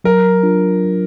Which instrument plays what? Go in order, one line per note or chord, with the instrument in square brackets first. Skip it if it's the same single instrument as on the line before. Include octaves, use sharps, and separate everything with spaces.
[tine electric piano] F#3 [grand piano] A#4
[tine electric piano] D4 F4